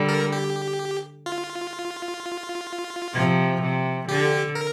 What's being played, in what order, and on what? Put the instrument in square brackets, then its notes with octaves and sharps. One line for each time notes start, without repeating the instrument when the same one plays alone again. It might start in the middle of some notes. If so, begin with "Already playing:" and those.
Already playing: [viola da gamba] D3 G3
[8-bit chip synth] A#4
G4
F4
[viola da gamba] C3 F3
C3
[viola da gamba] D3 [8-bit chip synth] G4
[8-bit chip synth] A#4